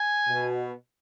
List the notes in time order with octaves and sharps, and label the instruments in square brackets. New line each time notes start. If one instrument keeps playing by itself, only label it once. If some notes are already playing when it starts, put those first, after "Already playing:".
Already playing: [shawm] G#5
[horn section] B2